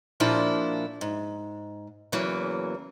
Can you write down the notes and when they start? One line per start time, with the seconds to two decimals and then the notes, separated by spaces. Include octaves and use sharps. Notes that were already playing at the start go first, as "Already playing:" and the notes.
0.20 A#2 F3 A#3 D4 E4 F#4
1.01 G#2
2.12 E2 C#3 E3 F#3 A#3